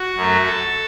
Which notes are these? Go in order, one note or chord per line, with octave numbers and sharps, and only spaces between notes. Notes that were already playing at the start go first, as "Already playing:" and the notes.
Already playing: F#4
F#2 F#3 A3
A4